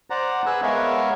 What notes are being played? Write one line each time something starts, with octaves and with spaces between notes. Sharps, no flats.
C5 D5 F#5 A#5
G#4 B4 G#5 E6 F#6
G#3 B3 A#4 C#5 E5 F5